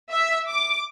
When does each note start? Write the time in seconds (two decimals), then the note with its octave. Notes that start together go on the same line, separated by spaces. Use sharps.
0.12 E5
0.49 D6